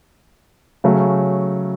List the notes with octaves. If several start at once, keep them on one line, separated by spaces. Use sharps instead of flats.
C#3 F#3 A3 C#4